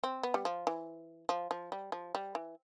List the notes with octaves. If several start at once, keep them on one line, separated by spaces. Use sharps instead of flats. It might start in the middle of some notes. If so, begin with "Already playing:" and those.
C4
B3
G3
F3
E3
F3
F3
G3
F3
G3
E3